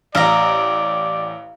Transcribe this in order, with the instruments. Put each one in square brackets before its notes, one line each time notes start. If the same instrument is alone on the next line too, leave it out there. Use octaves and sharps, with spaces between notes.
[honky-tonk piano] A1 [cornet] D5 [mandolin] F5 A#5